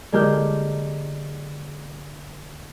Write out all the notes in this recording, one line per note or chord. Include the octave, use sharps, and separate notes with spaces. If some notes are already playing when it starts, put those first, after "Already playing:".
D3 G#3 A#3 G4 A#4 G6